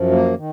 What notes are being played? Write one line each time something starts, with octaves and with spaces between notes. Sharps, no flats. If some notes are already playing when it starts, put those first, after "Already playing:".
Already playing: F#2 F3
A#3
D#3